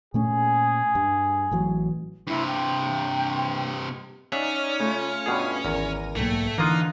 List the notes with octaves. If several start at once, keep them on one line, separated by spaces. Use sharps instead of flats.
A#2 A3 C#4 G#4
G2
A1 E3 F#3
G2 C3 E4
G5
C#4 D#4 G#4 C#5 D5 E5 F#5
C#3 A3 F4
G2 B2 G#4
G#1 E2 A#4 A#6 D#7
B1 G#2 A3 A#3 G5 G#6 A#6
D3 E3 A#3 D#4 F4 D#6 F#6